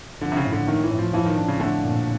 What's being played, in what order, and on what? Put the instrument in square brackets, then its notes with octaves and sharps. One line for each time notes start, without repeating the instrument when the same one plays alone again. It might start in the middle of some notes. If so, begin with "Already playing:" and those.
[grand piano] D3 [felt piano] F3
[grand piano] C3
C#3
[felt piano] A2
[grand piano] D3
[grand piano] D#3 [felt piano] A3
[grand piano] E3
[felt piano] A2
[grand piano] F3
[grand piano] E3 [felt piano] F3
[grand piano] D#3
[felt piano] D4
[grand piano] C#3
[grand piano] D3 [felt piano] A3
[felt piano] A#2